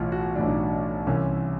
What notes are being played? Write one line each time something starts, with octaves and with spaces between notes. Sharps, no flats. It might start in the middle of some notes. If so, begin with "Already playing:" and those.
Already playing: B1 A2 E3 F4
F#4
B1 A2 E3 D4
D#4
D4
C2 C3 E3 C#4